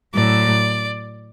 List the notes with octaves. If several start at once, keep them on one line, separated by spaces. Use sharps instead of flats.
A2 F#3 D5